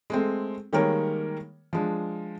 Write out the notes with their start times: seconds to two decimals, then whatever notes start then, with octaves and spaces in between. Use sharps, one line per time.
0.10 G#3 A3 C4
0.73 D#3 G3 G#3 A#3 A#4 C#5
1.73 F3 G#3 D4